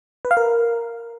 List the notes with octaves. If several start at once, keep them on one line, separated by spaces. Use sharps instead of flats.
B4
F5
A#4